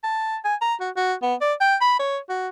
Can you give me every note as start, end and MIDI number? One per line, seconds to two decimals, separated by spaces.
0.04 0.37 81
0.45 0.55 80
0.61 0.74 82
0.80 0.90 66
0.96 1.14 66
1.22 1.35 59
1.41 1.53 74
1.60 1.76 79
1.81 1.97 83
1.99 2.18 73
2.29 2.49 66